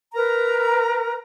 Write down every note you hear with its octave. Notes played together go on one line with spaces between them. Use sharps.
A#4 B4 A#5